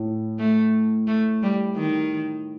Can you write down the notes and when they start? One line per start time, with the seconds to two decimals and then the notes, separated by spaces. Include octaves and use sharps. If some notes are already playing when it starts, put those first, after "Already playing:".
Already playing: A2
0.39 A3
1.07 A3
1.43 G3
1.77 D#3